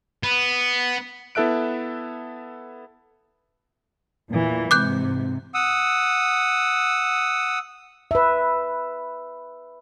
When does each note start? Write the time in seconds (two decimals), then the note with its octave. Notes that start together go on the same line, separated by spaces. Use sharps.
0.23 B3
1.35 B3 E4 A4 E5 F#6 D7
4.30 E2 A#2 E3
4.71 G#2 C3 D6 F#6 G6
5.54 F#5 D#6 E6
8.11 B4 E5